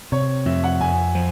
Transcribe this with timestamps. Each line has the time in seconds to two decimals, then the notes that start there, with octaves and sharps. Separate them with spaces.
0.12 C3 C#5
0.46 F2 E5
0.64 F#5
0.80 F2 G#5
1.15 F3